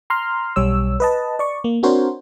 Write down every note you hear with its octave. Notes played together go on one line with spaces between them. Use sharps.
A#5 C6 F6
B1 G3 C#5 E6
B4 D#5 A5
D5 C#6
A#3
C4 D4 F#4 A#4 C5 C#5